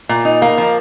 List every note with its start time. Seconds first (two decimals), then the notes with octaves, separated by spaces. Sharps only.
0.09 A#2
0.25 D#4
0.42 A#3
0.58 F3